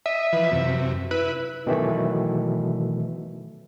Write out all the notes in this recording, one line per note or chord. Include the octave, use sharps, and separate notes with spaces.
D#5 E5
E3 F3 B4
F#2 C3
E4 B4
B2 D#3 E3 F#3 A3